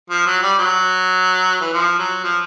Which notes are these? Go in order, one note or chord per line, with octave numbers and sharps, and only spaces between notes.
F3
F#3
G3
F#3
E3
F3
F#3
F3